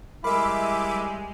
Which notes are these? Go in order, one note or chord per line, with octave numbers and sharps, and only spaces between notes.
G3 G#3 E4 A#4 E5 B5 D6